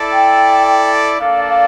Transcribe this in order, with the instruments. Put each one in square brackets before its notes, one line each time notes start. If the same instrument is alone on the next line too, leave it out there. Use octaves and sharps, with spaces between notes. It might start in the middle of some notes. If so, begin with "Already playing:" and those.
Already playing: [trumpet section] E4 A4 D5
[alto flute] G5
[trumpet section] A#3 D4 A4 D5 [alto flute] F5
[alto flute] F5